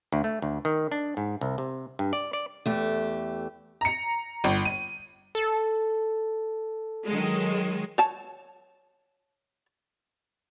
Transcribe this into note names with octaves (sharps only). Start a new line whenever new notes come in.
D2
A3
D2
D#3
D4
G#2
C2
C3
G2
D5
D5
E2 A3 G4
A#5 C#7
G1
D#7
A4
D#3 F#3 G#3
C#5 A5